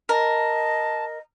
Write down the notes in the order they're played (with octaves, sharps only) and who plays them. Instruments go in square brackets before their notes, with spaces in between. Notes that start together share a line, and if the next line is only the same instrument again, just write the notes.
[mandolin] A#4 [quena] D#5 [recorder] A5